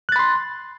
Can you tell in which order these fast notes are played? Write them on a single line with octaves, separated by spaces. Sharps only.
F#6 A6 B5 C6